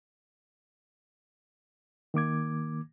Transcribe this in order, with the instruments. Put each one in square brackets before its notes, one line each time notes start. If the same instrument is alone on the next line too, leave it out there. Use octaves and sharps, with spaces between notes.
[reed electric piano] D#3 A#3 D6 G#6